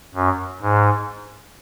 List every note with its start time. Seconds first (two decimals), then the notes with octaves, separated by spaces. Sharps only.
0.15 F#2
0.61 G#2